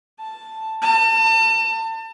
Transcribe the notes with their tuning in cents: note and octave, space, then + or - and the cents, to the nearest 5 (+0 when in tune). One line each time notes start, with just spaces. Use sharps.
A5 +0
A5 +35